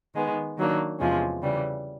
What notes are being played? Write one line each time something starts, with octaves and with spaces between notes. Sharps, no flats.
D#3 G#3 B3
D#3 F#3 A#3 D4
E2 C3 F3 G#3 C#4
C#3 E3 G3